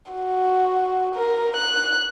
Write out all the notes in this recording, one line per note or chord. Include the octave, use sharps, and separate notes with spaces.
F#4
A#4
F#6